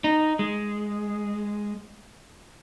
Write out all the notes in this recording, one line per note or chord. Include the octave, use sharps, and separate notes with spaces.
D#4
G#3